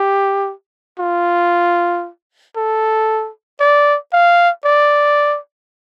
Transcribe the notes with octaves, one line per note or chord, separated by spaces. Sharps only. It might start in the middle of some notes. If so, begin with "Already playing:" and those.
Already playing: G4
F4
A4
D5
F5
D5